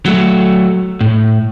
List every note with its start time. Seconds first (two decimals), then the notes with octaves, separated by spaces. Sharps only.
0.06 F#3 A3
1.01 A2